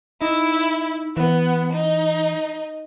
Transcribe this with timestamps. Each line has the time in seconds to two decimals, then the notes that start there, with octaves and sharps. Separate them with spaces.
0.22 D#4 E4
1.17 E3 B3
1.73 D#4